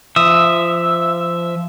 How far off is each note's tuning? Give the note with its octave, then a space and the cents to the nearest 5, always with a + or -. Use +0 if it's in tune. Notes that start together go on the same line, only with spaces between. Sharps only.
F3 -20 E5 +0 D#6 -5